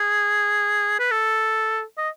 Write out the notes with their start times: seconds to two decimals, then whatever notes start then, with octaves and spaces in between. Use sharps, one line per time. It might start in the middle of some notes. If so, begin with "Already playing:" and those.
Already playing: G#4
0.99 B4
1.11 A4
1.98 D#5